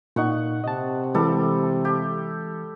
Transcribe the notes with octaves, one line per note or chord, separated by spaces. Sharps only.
A#2 D#4 F#5 C#6
C3 D#5 A5
E3 G3 G#3 A4
G4